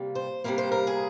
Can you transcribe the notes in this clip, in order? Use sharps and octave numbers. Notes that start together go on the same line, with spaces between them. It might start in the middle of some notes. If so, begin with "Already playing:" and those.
Already playing: C3 G3 A#3
C5
C3 G3 A#3 A#4
C5
A#4
G#4